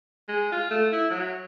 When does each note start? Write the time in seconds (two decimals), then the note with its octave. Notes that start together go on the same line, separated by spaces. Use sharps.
0.28 G#3
0.52 F4
0.70 A3
0.92 E4
1.10 F#3